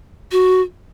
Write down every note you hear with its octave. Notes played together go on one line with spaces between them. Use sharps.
F#4